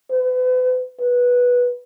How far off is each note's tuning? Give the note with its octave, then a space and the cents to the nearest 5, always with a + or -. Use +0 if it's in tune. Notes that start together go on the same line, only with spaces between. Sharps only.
B4 +40
B4 -10